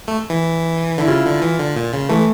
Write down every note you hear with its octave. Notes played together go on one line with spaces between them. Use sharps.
A3
E3
D3 E4
C#3 F4
D3
E3
D3
A#2
C#3
E3 A3